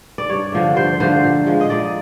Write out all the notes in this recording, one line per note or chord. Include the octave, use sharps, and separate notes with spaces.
D5
G2 C#5
D3 F3 A3
G2 C5
D3 F3 A3 C5
A#2
F3 G#3
D#5
A#2 D5